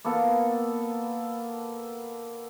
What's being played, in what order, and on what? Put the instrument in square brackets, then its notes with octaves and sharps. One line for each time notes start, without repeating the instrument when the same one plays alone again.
[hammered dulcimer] A#3 B3 A4